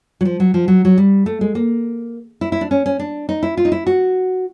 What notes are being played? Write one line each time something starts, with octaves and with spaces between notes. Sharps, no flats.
F#3
F3
F#3
F3
F#3
F#3
G3
A3
G#3
A#3
E4
E4
D4
C#4
C#4
D4
D#4
E4
F4
D#4
E4
F#4